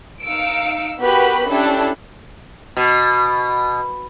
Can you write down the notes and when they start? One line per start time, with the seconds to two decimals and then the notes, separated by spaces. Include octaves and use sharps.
0.24 D#4 F5 E6 C#7 D7
1.02 B3 F#4 G4 A#4 B4 B5
1.50 C#4 D4 E4 G4 A4
2.77 B2